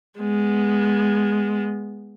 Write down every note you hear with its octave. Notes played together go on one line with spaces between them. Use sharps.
G#3 B3